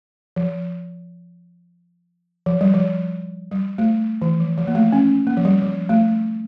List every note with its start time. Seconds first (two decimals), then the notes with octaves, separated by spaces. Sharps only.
0.36 F3
2.46 F3
2.61 G3
2.74 F3
3.51 G3
3.78 A3
4.22 E3
4.40 F3
4.58 F3
4.67 A#3
4.75 A3
4.92 C#4
5.27 A#3
5.37 F3
5.45 G3
5.62 F3
5.89 A3